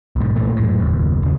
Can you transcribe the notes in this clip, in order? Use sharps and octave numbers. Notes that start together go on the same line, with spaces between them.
B1 G#2
A#2 E3 A3
F#2 A2
F#1 D#2
D#1 C#3